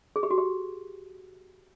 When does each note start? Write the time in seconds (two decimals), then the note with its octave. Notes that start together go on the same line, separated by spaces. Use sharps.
0.16 G#4
0.23 G4
0.30 F#4
0.38 G4